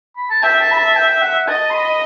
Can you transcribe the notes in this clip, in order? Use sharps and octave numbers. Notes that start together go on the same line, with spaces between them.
B5
A5
E5 G5
A5
B5
A5
G5
F#5
D#5 A5
C6
B5